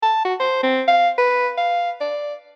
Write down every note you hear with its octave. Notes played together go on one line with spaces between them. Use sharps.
A5
F#4
C5
C4
F5
B4
F5
D5